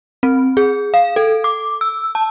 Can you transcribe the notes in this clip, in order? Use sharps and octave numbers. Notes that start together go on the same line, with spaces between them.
C4
G#4
F5
A4
D6
E6
A5